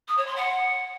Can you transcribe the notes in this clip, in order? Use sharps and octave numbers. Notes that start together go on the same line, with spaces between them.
D#6
C#5
C6
F#5